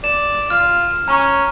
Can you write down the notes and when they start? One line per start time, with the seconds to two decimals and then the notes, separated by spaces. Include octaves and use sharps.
0.04 D5 E7
0.50 F4 F6
1.08 C#4 A#5 C#6